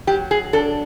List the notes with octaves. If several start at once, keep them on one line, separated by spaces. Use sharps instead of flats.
F#3 G4
G#4
D4 A4